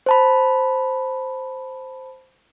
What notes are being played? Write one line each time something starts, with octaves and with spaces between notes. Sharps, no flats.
C5 A5 B5